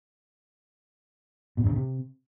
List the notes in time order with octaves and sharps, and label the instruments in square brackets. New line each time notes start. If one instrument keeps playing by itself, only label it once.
[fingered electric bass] B2
G2
C#3
C3